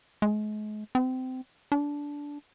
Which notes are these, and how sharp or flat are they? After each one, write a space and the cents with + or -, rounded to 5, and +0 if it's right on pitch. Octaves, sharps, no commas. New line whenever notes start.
G#3 +40
C4 -25
D4 -15